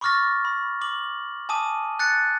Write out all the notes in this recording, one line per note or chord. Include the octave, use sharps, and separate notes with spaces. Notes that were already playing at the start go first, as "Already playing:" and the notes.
B5 C#6 D6 F6 A6 A#6
B5
D6 F#7
G#5 A5 D6 D#6 D#7
F#6 A6 C#7